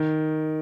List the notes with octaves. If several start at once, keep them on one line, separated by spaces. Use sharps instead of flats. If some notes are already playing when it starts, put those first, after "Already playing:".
Already playing: D#3